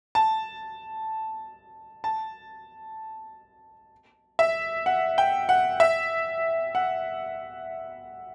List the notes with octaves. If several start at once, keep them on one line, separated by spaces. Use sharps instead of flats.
A5
A5
E5
F#5
G5
F#5
E5
F#5